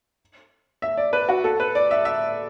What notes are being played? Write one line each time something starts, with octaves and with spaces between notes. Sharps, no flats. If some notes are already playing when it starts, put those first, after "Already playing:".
E5
D5
B4
F#4
A4
B4
D5
E5
E5